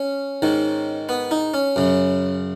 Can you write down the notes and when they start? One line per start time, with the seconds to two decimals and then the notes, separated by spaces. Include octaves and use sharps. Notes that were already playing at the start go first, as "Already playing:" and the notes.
Already playing: C#4
0.42 G#2 D#3
1.09 B3
1.31 D#4
1.54 C#4
1.76 F#2 C#3